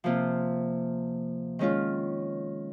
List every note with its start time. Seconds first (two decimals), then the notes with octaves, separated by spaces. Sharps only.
0.04 C3 F3 A#3 F4
1.59 D#3 G#3 C#4 F4